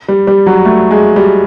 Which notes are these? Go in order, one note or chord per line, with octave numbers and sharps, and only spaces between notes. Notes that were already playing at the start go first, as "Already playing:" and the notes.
G3
G3
F#3
A3
G#3
G3